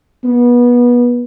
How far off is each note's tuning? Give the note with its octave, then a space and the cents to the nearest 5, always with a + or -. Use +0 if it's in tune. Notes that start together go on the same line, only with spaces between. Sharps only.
B3 -25